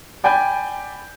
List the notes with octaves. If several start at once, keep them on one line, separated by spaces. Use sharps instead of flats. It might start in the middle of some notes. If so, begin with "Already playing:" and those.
D5 G5 G#5 B5 G6